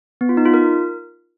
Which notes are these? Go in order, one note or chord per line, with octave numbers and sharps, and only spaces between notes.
B3
F4
D#4
F4
A#4